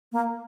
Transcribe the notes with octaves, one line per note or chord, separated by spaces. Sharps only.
A#3